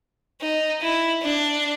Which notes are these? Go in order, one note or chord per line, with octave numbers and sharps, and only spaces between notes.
D#4
E4
D4